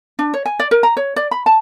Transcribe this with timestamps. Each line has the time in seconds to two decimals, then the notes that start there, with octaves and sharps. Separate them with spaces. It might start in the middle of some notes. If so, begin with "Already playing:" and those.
0.19 D4
0.34 C#5
0.46 G#5
0.59 D5
0.71 A#4
0.83 A#5
0.97 C#5
1.16 D5
1.31 B5
1.46 A5